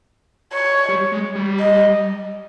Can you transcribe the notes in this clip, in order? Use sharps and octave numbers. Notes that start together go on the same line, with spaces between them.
C#5
G3
G#3
G3
D#5